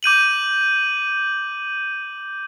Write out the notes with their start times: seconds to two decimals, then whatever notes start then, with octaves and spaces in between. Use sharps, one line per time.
0.03 D6 G6 D#7 F#7